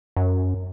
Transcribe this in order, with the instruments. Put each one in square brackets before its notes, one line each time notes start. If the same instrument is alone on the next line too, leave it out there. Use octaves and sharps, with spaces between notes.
[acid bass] F#2